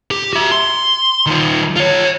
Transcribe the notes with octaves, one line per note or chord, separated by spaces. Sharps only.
G4
F#4 E5
C6
D#3 F4
F4 C#5